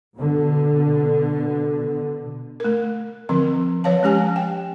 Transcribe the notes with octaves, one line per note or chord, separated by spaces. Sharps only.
B2 D3
A3 A#4
D3 F3 C4 A#4
F3 B4 C#5 F5 A5
G#3 C#4 G4 G#5
G5